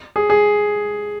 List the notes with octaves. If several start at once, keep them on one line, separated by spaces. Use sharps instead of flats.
G#4
G#4